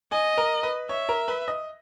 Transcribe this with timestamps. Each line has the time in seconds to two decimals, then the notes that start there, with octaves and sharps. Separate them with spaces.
0.12 D#5 G#5
0.37 A#4 A#5
0.63 B4 B5
0.89 C#5 E5 C#6
1.09 A#4 A#5
1.28 B4 B5
1.48 D#5 D#6